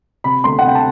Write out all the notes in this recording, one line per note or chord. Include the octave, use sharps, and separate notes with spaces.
C3 B5
D2 C6
F#5
C3 G5
A5